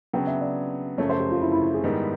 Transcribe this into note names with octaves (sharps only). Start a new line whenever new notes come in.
C#3 F#3 B3 D4 G5
E5
D5
F#2 C#3 F3 A3 C#5
C5
G4
F4
E4
E4
E4
G#4
G#2 D#3 G3 B3 E4